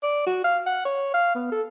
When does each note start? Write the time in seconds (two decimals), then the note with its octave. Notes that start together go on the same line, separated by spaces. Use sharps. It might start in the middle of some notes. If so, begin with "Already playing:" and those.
0.03 D5
0.26 F#4
0.44 F5
0.66 F#5
0.85 C#5
1.14 F5
1.35 B3
1.52 A4